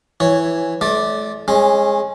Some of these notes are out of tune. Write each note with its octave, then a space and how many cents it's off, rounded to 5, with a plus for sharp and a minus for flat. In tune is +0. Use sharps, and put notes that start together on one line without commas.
E3 +0 C#5 +0
A3 -35 D5 +0
G#3 +0 C#4 -30